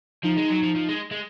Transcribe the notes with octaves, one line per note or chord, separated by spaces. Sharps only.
F3 D#4
G#3
F#3
F3
F3
G#3
G#3